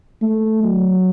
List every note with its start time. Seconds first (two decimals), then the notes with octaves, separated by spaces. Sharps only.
0.22 A3
0.63 F#3